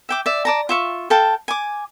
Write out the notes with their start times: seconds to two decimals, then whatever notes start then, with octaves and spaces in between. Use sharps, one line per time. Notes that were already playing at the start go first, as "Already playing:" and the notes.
0.09 E5 G5 D6
0.26 D5 E5
0.45 D5 A5 A#5
0.69 F4 E5 C#6
1.10 A4 F5 G5 A5
1.48 G#5 D6